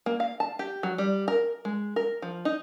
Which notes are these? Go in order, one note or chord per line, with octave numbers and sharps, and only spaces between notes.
A#3
F5
A5
G4
F#3
G3
A#4
G#3
A#4
F3
D#4